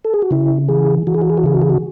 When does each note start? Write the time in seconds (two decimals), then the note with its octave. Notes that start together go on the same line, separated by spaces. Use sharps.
0.05 A4
0.14 G#4
0.22 F#4
0.31 C#3 E4
0.68 E3 G#4
1.07 E3 F#4
1.14 G#4
1.22 F#4
1.30 G#4
1.37 F#4
1.44 C#3 G#4
1.54 F#4
1.62 G#4
1.70 F#4